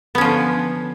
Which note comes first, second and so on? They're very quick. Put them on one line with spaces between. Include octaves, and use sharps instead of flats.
B3 C#4 F3 D3